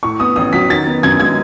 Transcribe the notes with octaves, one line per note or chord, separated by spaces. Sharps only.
A2 C#6
B3 D#6
A1 D#6
F#3 B6
D#3 A6
B3
F#2 G#6
G#3 G#6